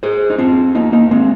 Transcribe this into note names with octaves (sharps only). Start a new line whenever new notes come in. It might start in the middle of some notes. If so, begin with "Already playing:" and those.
G#4 C5
D#4
C4 F4
A#3 D#4
A#3 D#4
G#3 C4